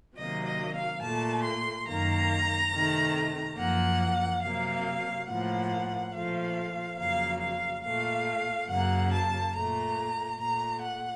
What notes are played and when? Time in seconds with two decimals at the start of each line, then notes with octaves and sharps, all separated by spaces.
0.16 C3 D#3 F#3 A#3 D#5
0.46 D#5
0.74 F5
1.01 A#2 A3 A5
1.44 C6
1.87 F#2 D#3 A#3 A#5
2.72 C3 D#3 A3
3.58 F#2 F3 A#3 F#5
4.42 C3 F#3 A#3 F5
5.28 A2 F3 A#3 F#5
6.14 A#2 F3 A3 F5
6.99 F2 C#3 F#3 A#3 F5
7.41 F5
7.84 A#2 A3 F5
8.69 F#2 C#3 F#3 A#3 F#5
9.12 A5
9.55 A#2 A3 A#5
10.39 A#2 A3 A#5
10.83 F#5